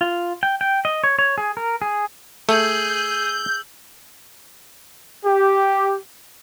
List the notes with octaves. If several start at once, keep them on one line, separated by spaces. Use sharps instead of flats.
F4
G5
G5
D#5
C#5
C#5
G#4
A#4
G#4
A3 G#4 E6 G6
G4